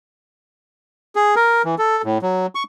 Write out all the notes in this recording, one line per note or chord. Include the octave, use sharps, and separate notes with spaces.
G#4
A#4
E3
A4
A2
F#3
C#6